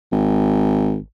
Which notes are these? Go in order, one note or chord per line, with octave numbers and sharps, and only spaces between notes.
G#1